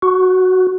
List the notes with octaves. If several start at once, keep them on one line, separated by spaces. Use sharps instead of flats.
F#4